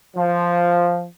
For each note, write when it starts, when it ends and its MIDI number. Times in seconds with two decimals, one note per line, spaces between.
0.16 1.05 53